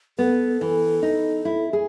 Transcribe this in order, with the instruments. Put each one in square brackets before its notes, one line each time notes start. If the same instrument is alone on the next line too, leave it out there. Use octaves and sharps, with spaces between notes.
[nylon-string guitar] B3 [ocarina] A4
[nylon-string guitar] E3
D#4
E4
G#4